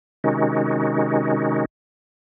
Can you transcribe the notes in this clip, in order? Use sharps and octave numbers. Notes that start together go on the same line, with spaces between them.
C3 D#3 G#3 C#4 D#4 F#4